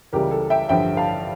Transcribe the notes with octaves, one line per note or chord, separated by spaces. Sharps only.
C#2 C#3 E3 G3 G4 A#4
A4
E5 G5
A1 G2 D3 F3 E5 G5
F5 A5